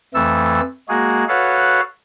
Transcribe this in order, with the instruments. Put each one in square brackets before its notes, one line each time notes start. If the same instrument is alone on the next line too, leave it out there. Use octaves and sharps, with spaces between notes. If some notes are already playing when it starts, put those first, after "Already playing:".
[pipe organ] F2 E3 A3 A4 E6
G#3 A#3 F#4 G#4
F#4 A4 B4 C#5 F5 F#5